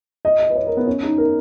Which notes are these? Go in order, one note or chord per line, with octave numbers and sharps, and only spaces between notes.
D#5
D#5
B4
C#5
A#4
B3
C#4
D#4
A#4